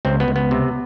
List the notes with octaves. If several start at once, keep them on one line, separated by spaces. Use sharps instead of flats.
C#2 C4
B3
C#2
B3
C3